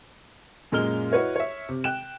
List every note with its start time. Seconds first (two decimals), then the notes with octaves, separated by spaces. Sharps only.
0.72 F#2 A#2 G#3 A#3 F6 G7
1.12 E4 F#4 B4 C#5 D#5
1.36 C#5 E5
1.69 C3
1.84 G5 F#6 E7